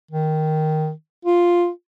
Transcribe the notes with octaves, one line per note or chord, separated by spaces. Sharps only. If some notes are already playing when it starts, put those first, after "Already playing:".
D#3
F4